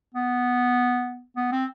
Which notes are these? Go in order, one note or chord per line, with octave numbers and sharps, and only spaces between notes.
B3
B3
C4